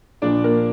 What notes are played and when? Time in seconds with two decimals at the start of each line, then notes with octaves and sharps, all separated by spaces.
0.22 A#1 A#2 F3 D4 D5
0.44 A#3 A#4